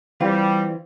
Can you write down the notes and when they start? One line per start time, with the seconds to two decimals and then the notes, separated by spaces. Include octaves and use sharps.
0.21 E3 G3 C4 F4